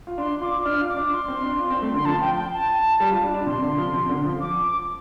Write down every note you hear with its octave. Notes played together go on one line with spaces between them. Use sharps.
F4
D4 C6
F4 D6
D4 F6
F4
D6
D4
C6
C4
D4
F4
C4
A3
D3 C6
F3 A5
G5
G5
A5
G3
F4
D4
D4
C3 C6
D3
F3
C3
D3
F3
D6